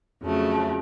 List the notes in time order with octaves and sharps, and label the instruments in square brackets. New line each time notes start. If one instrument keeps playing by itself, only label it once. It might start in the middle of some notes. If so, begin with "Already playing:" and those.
[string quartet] F2 C#3 F#3 A3